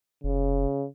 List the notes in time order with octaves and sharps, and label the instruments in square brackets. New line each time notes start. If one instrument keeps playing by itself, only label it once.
[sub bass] F1 [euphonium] C#3